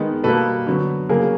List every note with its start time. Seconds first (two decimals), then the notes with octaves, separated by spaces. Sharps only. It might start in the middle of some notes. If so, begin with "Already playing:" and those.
Already playing: D#3 G#3 B3
0.24 B2 G3 A#3 A4 B4
0.67 D3 F#3 B3
1.09 C#3 F#3 A#3 G#4 A#4